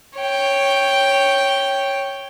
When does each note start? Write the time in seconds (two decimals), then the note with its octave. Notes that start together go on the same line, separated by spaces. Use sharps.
0.18 C#5 G5